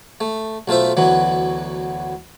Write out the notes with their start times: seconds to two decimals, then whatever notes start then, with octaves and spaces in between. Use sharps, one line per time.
0.21 A3
0.68 B1 A3 F4 C5 E5
0.97 D2 E3 F#3 B3